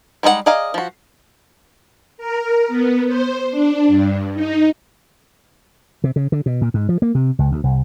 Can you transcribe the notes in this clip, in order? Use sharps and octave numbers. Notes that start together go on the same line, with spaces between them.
G3 G#3 D#4 F4 F#5
G#4 D5 D#5 F5 A#5
F3 F#4
A#4
B3
C5
D4
G2
D#4
C3
C#3
D3
B2
A#2
G#2
F3
A#3
C3
C#2
D2
C2